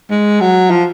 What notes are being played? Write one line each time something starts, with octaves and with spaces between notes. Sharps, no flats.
G#3
F#3
F3